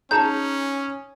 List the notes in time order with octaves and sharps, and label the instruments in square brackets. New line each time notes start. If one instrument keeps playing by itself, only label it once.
[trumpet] C#4 [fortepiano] D#4 G#4 A#5 [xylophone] A5 G6